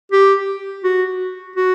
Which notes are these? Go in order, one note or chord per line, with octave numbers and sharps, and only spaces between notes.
G4
F#4
F#4